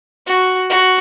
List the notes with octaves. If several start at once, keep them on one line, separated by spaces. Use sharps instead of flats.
F#4
F#4